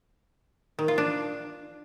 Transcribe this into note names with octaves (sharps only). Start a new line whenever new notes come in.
D#3
F4
D4